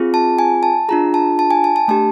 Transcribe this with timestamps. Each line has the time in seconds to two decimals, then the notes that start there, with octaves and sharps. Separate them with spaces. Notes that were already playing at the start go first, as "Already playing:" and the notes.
Already playing: C4 F4 G#4
0.14 A5
0.39 G#5
0.63 A5
0.89 D4 F4 G#4 A#5
1.14 A5
1.39 A5
1.51 G#5
1.64 A5
1.76 A5
1.88 A3 D4 G4 A5